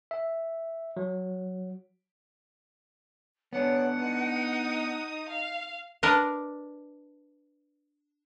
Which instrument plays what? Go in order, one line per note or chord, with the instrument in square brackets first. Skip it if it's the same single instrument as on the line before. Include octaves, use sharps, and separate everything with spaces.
[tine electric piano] E5
F#3
[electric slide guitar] B3 D4 [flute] C#5 [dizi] F#5
[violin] D#4 D#6 [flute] D#5
[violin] F5
[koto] D4 A#4 B4 D5 D#5